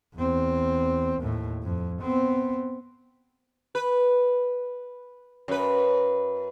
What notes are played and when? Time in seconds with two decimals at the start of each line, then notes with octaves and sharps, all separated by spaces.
0.15 E2 C4
1.19 D#2 A2
1.62 F2
2.01 B3 C4
3.75 B4
5.48 F#2 B4